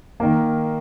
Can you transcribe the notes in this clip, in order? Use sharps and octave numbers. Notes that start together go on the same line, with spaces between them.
D#3 A#3